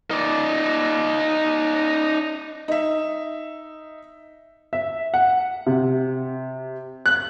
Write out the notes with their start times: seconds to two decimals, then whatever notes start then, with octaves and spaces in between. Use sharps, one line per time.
0.11 D#4 D5
2.68 D#4 E5
4.73 E5
5.14 F#5
5.66 C3
7.06 F#6